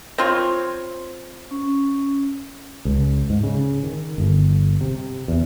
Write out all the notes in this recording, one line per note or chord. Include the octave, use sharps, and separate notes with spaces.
C4 F4 C#5
C#4
C#2
G#2
C#3
D#3
G1
C3
E2